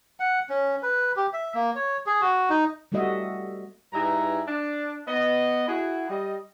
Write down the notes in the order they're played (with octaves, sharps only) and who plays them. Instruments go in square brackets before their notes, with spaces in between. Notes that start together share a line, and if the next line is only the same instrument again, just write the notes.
[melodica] F#5
C#4
B4
G4
E5
A#3
C#5
G#4
F#4
D#4
[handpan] G3 A3 C4 F#4 D#5 E5
[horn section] G2 D#4 E4 G#4 B4 A#5
D4
B3 D#5
E4 F#4 G#4
G3 D#5